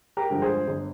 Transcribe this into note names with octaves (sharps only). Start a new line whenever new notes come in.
G4 A#4
G2 D3 F3 G#3
G#4 C5
G1